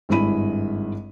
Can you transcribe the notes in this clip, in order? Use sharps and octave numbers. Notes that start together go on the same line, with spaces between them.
G#1 G2 G#3 E4 B5 D#7